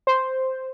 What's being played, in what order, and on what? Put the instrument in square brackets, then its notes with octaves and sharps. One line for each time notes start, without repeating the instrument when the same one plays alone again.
[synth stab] C5